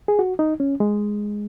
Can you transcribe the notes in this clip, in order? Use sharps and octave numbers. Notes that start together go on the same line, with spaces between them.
G#4
F#4
D#4
C#4
G#3